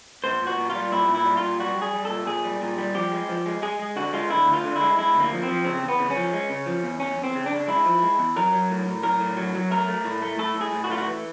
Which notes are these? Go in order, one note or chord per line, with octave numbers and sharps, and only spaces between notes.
A#2 C5
A#2
F#4
A#2
F4
G3
A#2 E4
A#2
E4
G3
F4
A#2
G3 F#4
G3
G#4
G3
A#2 A4
A#2 G#4
G3
A#2
G3
F3 G4
G#3
F3
G#3
G#3 G#4
G#3
D3 F#4
G#3 F4
D3 E4
D2
F4
D3
E4
G#3
G#3 E4
D2
A#3
F3
C4
F3
C#3 C4
E2
B3
C#3
C#4
F3
G#3
C#3
F3
E2
E2 C#4
E2
C4
C#3
D4
C#3
G#3 E4
F3
G#3
E2
F#3 A#4
F#3
A2
A2
F#3 A#4
A2
F#3
F#3
A3 A#4
A3
A2
A3
A2 A4
A2
G#4
A2
F#4
A3 F4
F#4
E3